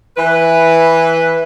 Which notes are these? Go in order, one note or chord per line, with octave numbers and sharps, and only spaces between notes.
E3 B4